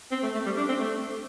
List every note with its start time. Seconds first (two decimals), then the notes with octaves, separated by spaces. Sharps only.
0.12 C4
0.23 A3
0.34 A3
0.46 G3
0.57 D4
0.69 C4
0.80 A3